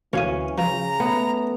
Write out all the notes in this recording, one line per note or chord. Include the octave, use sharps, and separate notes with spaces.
D2 E3 C#4 F5 D#6
C#3 F3 G5 A#5
A3 B3